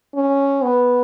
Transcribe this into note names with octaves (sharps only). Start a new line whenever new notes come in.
C#4
B3